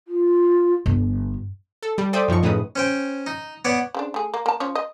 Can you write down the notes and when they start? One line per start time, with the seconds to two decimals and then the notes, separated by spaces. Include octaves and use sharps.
0.08 F4
0.86 G1
1.83 A4
1.98 G3
2.13 A4 C5 D5 E5 G5 D#6
2.28 F#2 F3 D#4 C#6
2.43 A2 C#3 D#4 B4 D#6
2.76 C#4 C5 G5
3.27 D#4
3.65 B3 C#5 D5 F#5
3.94 C#3 C4 D4
4.14 A3 G#4
4.34 A#3
4.46 A#3 A5
4.60 F3 C#4 C#5
4.75 D#5